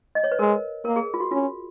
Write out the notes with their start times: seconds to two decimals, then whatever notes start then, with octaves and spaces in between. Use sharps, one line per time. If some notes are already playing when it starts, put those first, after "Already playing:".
0.15 D#5
0.24 C#5
0.31 B4
0.39 G#3 A#4
0.85 A#3 A#4
0.96 G#4
1.14 F4
1.20 F#4
1.31 C#4 F4